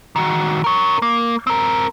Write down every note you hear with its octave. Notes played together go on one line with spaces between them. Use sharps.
D#3 F#4
A#4 C#5
A#3
C4 A#4